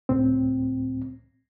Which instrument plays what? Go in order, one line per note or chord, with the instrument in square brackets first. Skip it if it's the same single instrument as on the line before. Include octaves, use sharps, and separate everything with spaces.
[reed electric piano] C#2 A2 C4